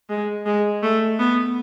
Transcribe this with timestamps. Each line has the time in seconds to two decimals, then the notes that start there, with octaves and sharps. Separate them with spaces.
0.10 G#3
0.46 G#3
0.83 A3
1.19 B3